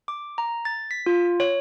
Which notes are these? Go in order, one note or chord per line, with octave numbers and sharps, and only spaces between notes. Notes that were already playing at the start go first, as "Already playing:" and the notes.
D6
A#5
A6
B6
F4
C#5